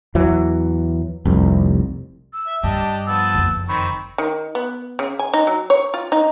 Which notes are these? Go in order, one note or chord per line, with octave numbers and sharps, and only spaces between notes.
E2 E3 F#3
F1 C2
E6
E5
G2 D4 G4 D#5 A5
F3 B3 A5 E6
F#1 F2
D#3 C4 B5 C#6
D#3
B3
C#3
G#5
D#4
F#3
C#5
F4
D#4